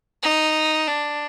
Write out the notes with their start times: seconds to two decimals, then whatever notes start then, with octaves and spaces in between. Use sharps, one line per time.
0.23 D#4
0.88 D4